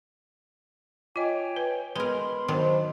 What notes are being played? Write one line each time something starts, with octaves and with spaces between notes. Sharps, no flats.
F4 C#5 D#5 G5 G#5
B4
G#3 B3 A#4 B4 B5 C6
D#3 F#3 D4 C5